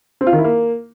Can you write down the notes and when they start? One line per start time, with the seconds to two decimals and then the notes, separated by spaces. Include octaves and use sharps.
0.21 C4
0.27 F4
0.33 D#3
0.38 E4
0.44 A#3